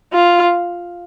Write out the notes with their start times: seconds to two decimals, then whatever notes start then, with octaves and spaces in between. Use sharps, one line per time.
0.13 F4